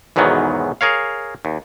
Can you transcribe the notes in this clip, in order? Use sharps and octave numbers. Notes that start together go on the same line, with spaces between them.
B1 E2 G#2 D#3 F#3 B3
G#4 A#4 C#5 F5
D#2